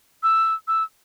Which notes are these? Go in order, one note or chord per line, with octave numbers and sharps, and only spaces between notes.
E6
E6